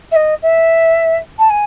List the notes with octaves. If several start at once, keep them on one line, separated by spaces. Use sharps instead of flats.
E5
D#5
E5
A5
G#5